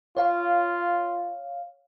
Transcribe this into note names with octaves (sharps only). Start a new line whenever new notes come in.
F4 C#5 F5